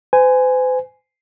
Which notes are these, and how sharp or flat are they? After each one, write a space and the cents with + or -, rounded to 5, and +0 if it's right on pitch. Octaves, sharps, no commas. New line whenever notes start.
C5 -45 G#5 +0